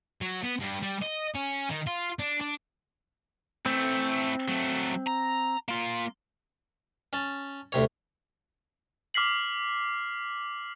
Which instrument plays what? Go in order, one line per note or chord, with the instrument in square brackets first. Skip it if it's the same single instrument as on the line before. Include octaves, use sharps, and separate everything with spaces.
[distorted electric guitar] F#3
B3
G2
G3
D#5
C#4
D#3
F4
D4
D4
[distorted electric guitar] E3 A3 [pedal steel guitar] C4
[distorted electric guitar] F#3 A3
A#5
A#3 F4
[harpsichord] C#4 A5
D2 C3 C#5
[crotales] D6 F6 B6 C7 F#7